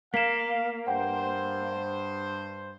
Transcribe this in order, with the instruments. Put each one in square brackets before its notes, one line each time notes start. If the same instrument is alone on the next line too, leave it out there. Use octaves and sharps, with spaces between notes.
[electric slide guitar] A#3 [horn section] F5 [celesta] B6 E7
[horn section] G2 C5 [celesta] F#5 G5